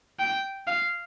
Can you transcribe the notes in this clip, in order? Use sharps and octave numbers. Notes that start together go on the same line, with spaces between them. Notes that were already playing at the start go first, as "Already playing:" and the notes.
G5
F5